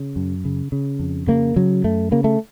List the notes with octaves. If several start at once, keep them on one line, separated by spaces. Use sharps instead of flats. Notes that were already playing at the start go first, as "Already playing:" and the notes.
Already playing: C#3
F#2
C#3
C#3
F2
C#3 A#3
C#3 F#3
F#2 A3
C#3 A#3
A3